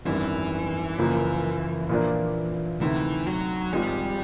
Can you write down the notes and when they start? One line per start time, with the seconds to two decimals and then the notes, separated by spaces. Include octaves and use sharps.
0.06 G#1 F#2 D#3 E3 G3
0.98 F#1 F#2 C#3 F3 A#3
1.89 A#2 F3 A#3 D4
2.81 D2 C3 D#3 E3
3.27 F#3
3.73 G#1 G#2 F3 G3 G#3